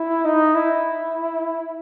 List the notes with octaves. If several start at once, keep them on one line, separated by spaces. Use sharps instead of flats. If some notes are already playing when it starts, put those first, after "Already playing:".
Already playing: E4
D#4
E4